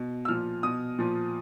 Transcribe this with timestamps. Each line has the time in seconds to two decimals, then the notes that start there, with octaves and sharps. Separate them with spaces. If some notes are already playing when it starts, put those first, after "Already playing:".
Already playing: B2
0.25 E6
0.28 A#2 F3 F6
0.63 B2 D#6
0.99 A#2 F3